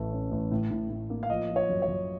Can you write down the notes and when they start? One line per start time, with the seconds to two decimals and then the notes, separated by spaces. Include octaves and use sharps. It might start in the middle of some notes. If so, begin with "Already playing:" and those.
Already playing: A1 A3
0.12 C#4
0.32 A1
0.51 A2
0.71 A2
0.90 A2
1.10 A#3
1.23 F5
1.30 F3 D#5
1.50 F3
1.56 C#5
1.69 F#2
1.82 C#5
1.89 F#2